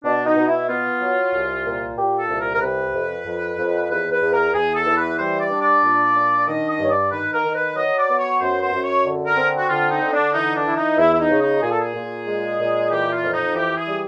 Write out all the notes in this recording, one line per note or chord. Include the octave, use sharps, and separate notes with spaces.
B2 D4
D#4
B2
E4
B3 F4
F#3
C2
A#2
A#2 G4
A4
C2
A#4
A#4
C3 B4
F2
F2
F2
E2 B4
B4
E2
A#4
E2 G#4
A4
E3
B4
G3 C5
D5
D4
D5
A#2
D4
D#3 D#5
D#5
G2 C#5
D5
D#3 B4
A#4
D#3
B4
F#3 D#5
D5
B3
C#5
F#2 C5
C5
F#2
C#5
D3
A#4
C4
F#4
D3 F4
D#4
D3
D4
E3 D#4
D4
E3 E4
D#4
E2 E4
E4
D#4
C#3
D#4
A#2 G#4
A4
G#4
A#2
G#3
A#2
E3 G4
F4
F2
D#4
E3 G4
G#4
G3